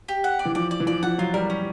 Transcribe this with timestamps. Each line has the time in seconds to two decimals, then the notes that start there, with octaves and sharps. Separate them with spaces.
0.08 G4
0.24 F#5
0.39 D5
0.45 E3
0.55 F3 D5
0.71 D5
0.80 E3
0.87 F3 D5
1.03 F3 F#5
1.18 F#3 F4
1.34 G3 A#4
1.50 C#4